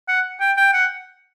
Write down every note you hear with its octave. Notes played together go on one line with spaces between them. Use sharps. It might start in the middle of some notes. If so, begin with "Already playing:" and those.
F#5
G5
G5
F#5